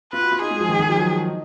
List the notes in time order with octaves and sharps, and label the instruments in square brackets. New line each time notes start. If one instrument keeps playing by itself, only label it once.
[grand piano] F4 [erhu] B4
[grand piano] F#4
F4
[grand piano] D#4 [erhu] G#4
[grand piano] G#3
F3
D#3
D#3
F3
F#3
D#4